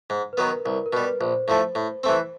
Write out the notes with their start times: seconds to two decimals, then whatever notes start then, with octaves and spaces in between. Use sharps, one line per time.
0.10 G#2
0.33 B4
0.37 D#3 F#3 B3 A#4
0.65 C2 A#4
0.86 A#4
0.93 B2 B4
0.97 G3
1.21 A#1 C5
1.48 A2 F3 A3
1.75 A2
2.04 E3 A3 C4